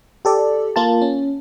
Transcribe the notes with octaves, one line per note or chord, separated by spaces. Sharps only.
G4 A4 D5
A#3 F4 A5
C#4